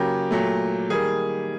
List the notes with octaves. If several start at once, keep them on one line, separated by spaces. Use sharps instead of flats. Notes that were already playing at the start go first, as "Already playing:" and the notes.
Already playing: C#3 F#3 A#3 G4
A#2 F#3 A3
D#3 G3 A#3 G#4